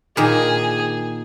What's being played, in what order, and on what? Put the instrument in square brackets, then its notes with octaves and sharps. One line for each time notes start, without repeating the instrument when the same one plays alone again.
[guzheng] A#2 D#3 [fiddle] G#4